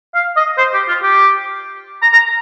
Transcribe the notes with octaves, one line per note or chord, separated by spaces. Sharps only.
F5
D#5
C5
G4
F4
G4
A#5
A#5